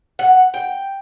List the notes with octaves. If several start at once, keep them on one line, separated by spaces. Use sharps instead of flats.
F#5
G5